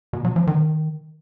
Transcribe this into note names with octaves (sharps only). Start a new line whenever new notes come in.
B2
F#3
F3
D#3